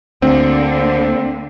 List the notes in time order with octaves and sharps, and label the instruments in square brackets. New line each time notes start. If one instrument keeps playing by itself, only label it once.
[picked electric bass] D2 [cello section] D3 A#3 [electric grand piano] C4